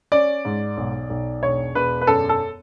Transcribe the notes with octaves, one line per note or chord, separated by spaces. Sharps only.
C#4 D5
G#2
B1
B1
E1 C#5
E1 B4
B4
F#2 A4
A4